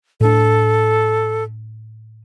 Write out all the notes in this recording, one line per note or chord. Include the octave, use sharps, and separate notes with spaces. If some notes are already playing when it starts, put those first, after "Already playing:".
A2 D4 A4